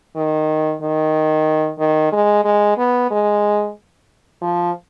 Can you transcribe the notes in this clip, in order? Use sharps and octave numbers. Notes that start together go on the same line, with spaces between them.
D#3
D#3
D#3
G#3
G#3
B3
G#3
F3